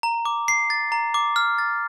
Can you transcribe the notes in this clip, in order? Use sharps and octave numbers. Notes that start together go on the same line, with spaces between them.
A#5
D6
C7
A6
A#5
D6
F6
A6